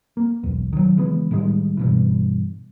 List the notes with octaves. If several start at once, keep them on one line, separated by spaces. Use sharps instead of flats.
A#3
B1 E2
D#3 F#3
C#3 E3 G#3 B3
A2 D#3 G3 G#3
G2 B2 E3